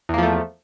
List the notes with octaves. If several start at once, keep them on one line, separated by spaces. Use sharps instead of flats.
E2 F3 A3 A#3